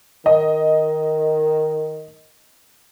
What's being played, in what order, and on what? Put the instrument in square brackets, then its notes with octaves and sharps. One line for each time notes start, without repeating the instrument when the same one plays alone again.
[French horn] D#3 [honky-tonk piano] D#5